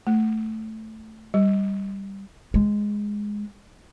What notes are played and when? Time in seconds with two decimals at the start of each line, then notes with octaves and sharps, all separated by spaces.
0.07 A3
1.34 G3
2.54 G#3